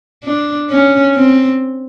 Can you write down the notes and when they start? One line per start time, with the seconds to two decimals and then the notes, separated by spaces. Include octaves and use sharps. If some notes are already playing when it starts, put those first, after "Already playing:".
0.24 D4
0.70 C#4
1.15 C4